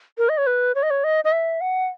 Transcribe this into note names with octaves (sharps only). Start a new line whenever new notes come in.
A#4
D#5
C#5
B4
C#5
D#5
C#5
D#5
D#5
E5
F#5